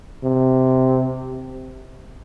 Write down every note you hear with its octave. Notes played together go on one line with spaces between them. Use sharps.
C3